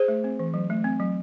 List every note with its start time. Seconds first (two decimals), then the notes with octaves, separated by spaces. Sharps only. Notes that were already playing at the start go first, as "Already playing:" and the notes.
Already playing: G#4 C5
0.08 A3
0.24 C4
0.39 E3
0.54 F#3
0.70 A3
0.84 C4
1.00 F#3